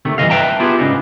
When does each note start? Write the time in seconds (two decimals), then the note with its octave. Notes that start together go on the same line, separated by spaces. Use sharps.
0.05 D2 C3 D#3 A3
0.18 G2 E3 B3 D#5 F5
0.30 B4 E5 F5 G5 A5 A#5
0.60 B3 E4 F4 G4 G#4
0.79 G#2 C#3 D4 D#4